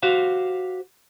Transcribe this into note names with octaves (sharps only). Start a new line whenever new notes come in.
F#4 G4 C5 F5